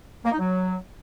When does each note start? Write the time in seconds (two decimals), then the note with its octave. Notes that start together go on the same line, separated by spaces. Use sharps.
0.25 A#3
0.32 D#4
0.39 F#3